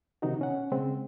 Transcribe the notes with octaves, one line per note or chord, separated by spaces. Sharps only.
C3 D#3 E3 D#4 F#4
B2 C#4 F#5
C#3 G#3 C4